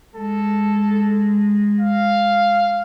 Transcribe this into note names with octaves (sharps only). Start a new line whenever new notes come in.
G#3 A4
F5